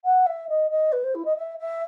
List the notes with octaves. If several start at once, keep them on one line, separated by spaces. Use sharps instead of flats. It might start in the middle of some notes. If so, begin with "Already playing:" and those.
F#5
E5
D#5
D#5
B4
C5
E4
D#5
E5
E5